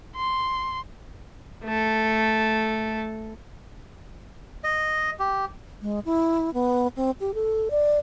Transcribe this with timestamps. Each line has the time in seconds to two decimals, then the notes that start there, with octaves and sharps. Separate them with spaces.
0.16 C6
1.64 A3 A4
4.64 D#5
5.19 G4
5.82 G#3
6.05 E4
6.54 B3
6.96 C4
7.20 G4
7.34 A4
7.71 D5